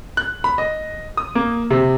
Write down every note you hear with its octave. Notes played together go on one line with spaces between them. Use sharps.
F#6
B5
D#5
D#6
A#3
C3